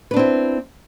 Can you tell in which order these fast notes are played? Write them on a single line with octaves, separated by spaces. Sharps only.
B4 D4 C4 E4